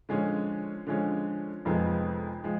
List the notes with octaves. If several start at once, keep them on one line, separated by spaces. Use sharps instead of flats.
D3 F3 G#3 C#4
D3 F3 G#3 C#4
F1 F2 F3 G#3 B3
F3 G#3